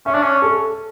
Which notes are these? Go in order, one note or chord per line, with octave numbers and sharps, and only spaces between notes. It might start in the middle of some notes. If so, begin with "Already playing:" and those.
C#4 E5
D4
C#4
A4